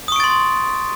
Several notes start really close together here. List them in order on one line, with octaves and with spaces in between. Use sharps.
D#6 C#6 D7 A6 C6